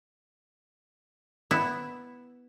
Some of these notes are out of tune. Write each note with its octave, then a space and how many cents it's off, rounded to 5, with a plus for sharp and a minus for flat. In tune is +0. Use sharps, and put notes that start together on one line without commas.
B3 +0 E4 +0